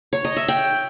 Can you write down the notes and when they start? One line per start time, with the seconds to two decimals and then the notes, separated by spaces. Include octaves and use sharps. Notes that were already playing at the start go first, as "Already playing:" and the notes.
0.13 C#5
0.25 D#5
0.36 E5
0.48 G5